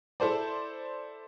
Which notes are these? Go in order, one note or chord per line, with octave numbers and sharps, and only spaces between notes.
E4 A4 C5 D5